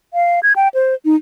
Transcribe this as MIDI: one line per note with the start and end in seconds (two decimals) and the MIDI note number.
0.14 0.40 77
0.43 0.53 92
0.56 0.68 79
0.74 0.94 72
1.05 1.15 63